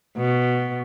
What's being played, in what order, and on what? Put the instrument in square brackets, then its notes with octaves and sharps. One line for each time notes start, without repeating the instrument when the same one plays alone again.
[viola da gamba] B2